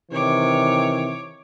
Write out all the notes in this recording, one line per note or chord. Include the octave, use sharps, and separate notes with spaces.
C3 D#3 E3 C#5 D6